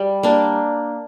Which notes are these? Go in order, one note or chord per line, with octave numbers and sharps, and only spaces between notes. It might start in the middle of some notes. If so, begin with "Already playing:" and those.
Already playing: G3
A#3 D4